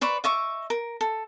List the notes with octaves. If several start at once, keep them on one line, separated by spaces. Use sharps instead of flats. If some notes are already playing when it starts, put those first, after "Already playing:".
B4 C5 D5 C#6
D#5 E5 C#6 D6
A#4
A4